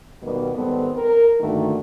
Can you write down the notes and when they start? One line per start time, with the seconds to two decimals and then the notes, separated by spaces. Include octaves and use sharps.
0.23 B2 D#3 G3 A#3 B3
0.55 G#2 D#3 G3 B3 C4 A4
0.97 A#4
1.41 G2 D3 D#3 A3 A#3 F#4